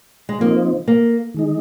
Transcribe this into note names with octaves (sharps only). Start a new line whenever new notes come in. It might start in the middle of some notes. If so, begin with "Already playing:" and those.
G#3
F3 A#3 C4 D#4
A#3
D#3 G#3 D#4